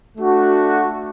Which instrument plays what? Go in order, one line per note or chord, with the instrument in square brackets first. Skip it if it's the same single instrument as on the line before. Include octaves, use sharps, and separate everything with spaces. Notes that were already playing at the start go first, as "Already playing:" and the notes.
[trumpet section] A3 D4 F#4